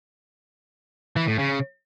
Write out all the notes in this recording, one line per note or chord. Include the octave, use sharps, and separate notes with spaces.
E3
A2
C#3